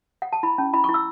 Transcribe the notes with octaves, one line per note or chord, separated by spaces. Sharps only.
F#5
A5
E4 B5
C#4 A5
E4 B5
C#6
E4
E6